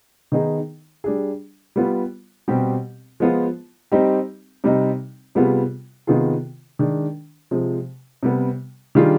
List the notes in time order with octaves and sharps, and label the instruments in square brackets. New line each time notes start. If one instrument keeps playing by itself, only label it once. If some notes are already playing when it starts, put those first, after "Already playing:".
[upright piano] D#3 B3 D#4 G#4
G3 D4 G#4
G3 B3 F4
B2 G3 C4 G4
F3 G#3 B3 F4
G3 C4 D#4 G4
C3 G3 C4 D#4
C3 G3 B3 F4 G#4
C3 D#3 B3 F4 G#4
D#3 G#3 D4
C3 F3 G#3
C3 G3 B3
D#3 G3 D4 F4 G#4